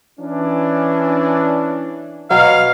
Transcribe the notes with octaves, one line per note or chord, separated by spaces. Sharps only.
E3 C#4 D4
B2 F#3 F5